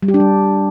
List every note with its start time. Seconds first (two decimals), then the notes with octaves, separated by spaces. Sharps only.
0.03 G3
0.08 G4
0.14 D4
0.20 G3